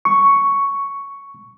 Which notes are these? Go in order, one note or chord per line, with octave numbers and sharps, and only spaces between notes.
C#6